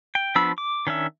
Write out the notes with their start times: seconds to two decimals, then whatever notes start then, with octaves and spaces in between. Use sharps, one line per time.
0.15 G5
0.35 F3 B3 D4 B5 E6
0.58 D6
0.87 D#3 C#4 D4 E5